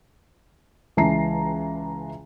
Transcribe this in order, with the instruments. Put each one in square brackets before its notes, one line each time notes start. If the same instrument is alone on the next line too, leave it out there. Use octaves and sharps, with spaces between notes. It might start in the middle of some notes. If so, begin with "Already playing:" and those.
[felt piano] C#2 E3 G#3 A5 A#5 C7